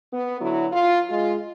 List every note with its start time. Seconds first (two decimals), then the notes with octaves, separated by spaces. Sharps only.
0.12 B3
0.41 D3 F#3 E4 F#4
0.72 F4
1.10 G#3 F4